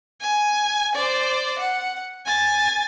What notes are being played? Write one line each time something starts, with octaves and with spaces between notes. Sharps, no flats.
G#5
C5 D5
F#5
G#5 A6